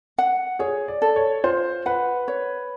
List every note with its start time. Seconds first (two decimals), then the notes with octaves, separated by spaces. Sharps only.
0.18 F#5
0.59 G#4 C#5
0.88 D5
1.02 A4
1.16 C#5
1.44 F4 C5
1.86 B4 F#5
2.28 C#5